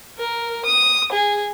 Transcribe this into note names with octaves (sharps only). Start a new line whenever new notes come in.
A#4
D#6
G#4